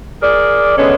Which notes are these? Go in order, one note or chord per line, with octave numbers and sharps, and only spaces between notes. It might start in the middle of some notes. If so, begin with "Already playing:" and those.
G#4 A#4 D5
D3 G#3 B3 C#4 D4